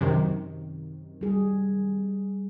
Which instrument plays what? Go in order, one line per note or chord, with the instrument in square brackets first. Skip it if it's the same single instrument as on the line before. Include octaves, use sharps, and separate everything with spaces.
[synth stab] F#2 C3 D#3
[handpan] G3 G#4